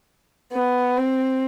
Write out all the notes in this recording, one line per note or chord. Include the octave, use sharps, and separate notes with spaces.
B3
C4